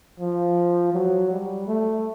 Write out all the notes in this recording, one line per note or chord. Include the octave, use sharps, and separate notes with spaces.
F3
F#3
G3
A3